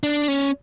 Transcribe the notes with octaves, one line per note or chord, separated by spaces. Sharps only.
D4
C#4